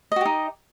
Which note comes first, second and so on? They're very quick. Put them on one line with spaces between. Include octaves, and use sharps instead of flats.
D#5 F#4 G4 D#4